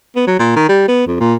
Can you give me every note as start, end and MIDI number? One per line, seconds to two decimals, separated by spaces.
0.16 0.25 59
0.27 0.36 54
0.39 0.52 46
0.56 0.66 51
0.69 0.83 55
0.88 1.07 59
1.07 1.19 41
1.20 1.34 46